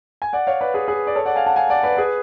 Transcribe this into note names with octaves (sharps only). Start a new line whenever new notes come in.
G#5
D5 F#5
C#5 F5
B4 D5
G#4 B4
G#4 B4
D5
A4 C#5
D5 F#5
F5 G#5
F#5 A5
F5 G#5
D5 F#5
B4 D5
G#4 B4